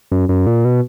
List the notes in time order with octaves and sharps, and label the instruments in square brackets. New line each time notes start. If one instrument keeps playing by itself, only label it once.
[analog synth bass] F#2
F#2
A#2
B2